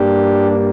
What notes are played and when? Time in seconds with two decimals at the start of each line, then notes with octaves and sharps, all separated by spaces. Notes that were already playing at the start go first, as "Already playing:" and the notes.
Already playing: G2 G3 A#3 D4 G4